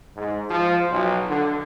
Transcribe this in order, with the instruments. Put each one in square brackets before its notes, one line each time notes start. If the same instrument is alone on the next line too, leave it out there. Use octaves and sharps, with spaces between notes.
[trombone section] G#2
F3
B1
D3